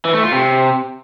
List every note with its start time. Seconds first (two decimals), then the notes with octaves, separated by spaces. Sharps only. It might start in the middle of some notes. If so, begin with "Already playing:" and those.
0.05 E3
0.14 A3
0.23 F4
0.32 C3